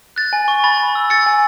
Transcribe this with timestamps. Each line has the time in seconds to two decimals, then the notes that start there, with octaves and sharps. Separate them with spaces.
0.16 F#6 A6
0.33 G#5
0.48 C#6
0.64 B5 A6
0.80 B5
0.95 E6
1.10 E6 A6 C#7
1.26 G#5